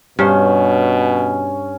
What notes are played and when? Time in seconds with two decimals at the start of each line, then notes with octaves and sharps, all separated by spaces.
0.19 G2 B2 C#4 C5